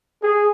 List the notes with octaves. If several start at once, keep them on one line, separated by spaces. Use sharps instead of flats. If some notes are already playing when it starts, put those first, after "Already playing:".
G#4